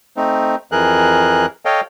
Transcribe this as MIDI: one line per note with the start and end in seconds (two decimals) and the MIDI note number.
0.17 0.56 57
0.17 0.56 60
0.17 0.56 63
0.72 1.46 41
0.72 1.46 52
0.72 1.46 68
0.72 1.46 70
0.72 1.46 90
1.65 1.81 69
1.65 1.81 73
1.65 1.81 75
1.65 1.81 77
1.65 1.81 79